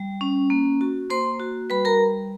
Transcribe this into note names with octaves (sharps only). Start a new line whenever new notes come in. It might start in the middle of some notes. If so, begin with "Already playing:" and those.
Already playing: G3
C#4
A#3
F#4
A#3 C5 C6
F#4
G3 B4 B5
A#4 A#5